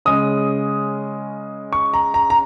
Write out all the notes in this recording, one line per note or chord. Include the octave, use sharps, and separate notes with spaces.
C#3 G#3 C#4 D#6
C#6
A#5
A#5
A#5